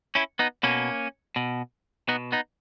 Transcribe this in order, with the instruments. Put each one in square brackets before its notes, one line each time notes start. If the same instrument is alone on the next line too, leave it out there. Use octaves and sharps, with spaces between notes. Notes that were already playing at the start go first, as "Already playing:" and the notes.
[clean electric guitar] C#4 E4
B3 D#4
B2 A#3 C#4
B2
B2 B3 D#4
B3 D#4